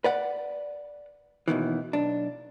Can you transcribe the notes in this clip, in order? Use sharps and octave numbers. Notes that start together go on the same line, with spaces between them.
B4 D5 F#5
D#2 B2 D#3 E3
B1 D4